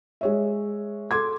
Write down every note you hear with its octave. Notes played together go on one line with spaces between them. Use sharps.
G#3 C#5 E5
A4 C6 D6 G#6